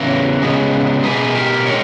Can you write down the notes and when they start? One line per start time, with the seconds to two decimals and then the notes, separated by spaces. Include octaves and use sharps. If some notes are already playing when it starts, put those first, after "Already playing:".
Already playing: E2 C#3 E3 A#4 C#5
0.42 C#3 G#3 B3
1.04 B2 A#3 G#4 B4
1.35 G4 A#4
1.66 D#3 G#3 A#4 C#5